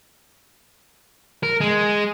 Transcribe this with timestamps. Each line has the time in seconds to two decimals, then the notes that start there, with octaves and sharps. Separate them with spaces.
1.43 A#4
1.61 G#3